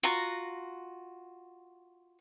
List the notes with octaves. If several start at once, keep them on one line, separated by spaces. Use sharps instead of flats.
F4 F#4 A#5